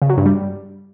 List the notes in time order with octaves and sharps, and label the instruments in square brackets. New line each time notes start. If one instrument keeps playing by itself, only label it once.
[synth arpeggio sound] C#3
F#3
G2
G3